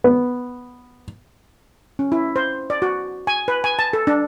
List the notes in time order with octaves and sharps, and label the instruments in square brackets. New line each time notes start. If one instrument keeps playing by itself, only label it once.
[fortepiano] B3
[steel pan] C#4
E4
C5
D5
F#4
G#5
B4
G#5
A5
A4
D4